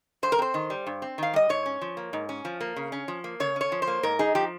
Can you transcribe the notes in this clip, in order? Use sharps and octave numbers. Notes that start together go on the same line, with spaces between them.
G2 C5
A#4
C4 C5
D#3
G3
G2
C4
D#3 F5
G3 D#5
G#2 C#5
C#4
F3
A#3
G#2
C#4
F3
A#3
C#3
C#4
F3
A#3
C#3 C#5
C#4 C#5
F3
C5
A#3
G#2 A#4
D#4 G#4
F3 G4